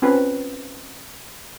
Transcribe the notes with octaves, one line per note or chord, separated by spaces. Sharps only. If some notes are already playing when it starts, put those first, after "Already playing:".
C4 C#4 F4 B4